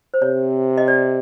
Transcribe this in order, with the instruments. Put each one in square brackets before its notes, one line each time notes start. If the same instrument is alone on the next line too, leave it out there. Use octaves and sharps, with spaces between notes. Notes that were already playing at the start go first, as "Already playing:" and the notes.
[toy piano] C5
[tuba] C3 [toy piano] C#5
[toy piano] D#5
D5